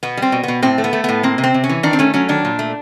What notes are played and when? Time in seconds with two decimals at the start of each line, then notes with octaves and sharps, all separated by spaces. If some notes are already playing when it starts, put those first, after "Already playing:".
0.03 B2 B3
0.17 G3 C4
0.32 B2
0.43 B2 B3
0.62 A2 C4
0.78 A3
0.84 B3
0.93 A3
1.04 A2 B3
1.23 A#3 C4
1.38 C3
1.44 C4
1.54 C3
1.64 C#4
1.69 E3
1.83 D#3 D4
1.93 C4
1.99 A3 C#4
2.14 F#3 C#4
2.29 D#3 D4
2.45 A#2
2.59 A3